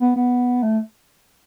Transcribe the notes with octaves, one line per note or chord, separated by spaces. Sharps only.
B3
B3
A3